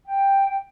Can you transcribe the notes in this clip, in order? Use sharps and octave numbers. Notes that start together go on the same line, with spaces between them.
G5